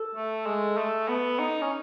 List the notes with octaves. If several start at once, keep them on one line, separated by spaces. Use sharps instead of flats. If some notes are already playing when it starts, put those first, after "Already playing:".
Already playing: A4
A3
G#3
A3
B3
D#4
C#4